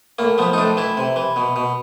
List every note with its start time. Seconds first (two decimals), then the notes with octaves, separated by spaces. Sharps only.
0.19 A2 A#3
0.38 F3 B3
0.53 D#4
0.58 A2 D4
0.77 E3 E4
0.97 C3
1.16 E3
1.36 B2
1.56 B2